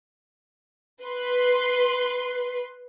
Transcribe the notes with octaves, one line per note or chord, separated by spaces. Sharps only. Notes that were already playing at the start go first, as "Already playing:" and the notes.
B4 C6